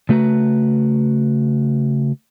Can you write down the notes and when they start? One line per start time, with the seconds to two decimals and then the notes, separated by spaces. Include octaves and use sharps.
0.09 C#3 A3 F#4 B4 A#5